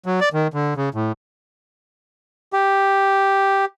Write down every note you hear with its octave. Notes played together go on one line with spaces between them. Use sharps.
F#3
D5
D#3
D3
C#3
A2
G4